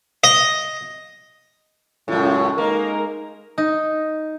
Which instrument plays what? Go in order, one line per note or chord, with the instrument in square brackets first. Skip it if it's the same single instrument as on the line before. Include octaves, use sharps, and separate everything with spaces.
[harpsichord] D#5
[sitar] F#2 A2 [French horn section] C#3 G#3 F4
[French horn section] G#3 D#4 A#4 [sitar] A#3
[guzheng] D#4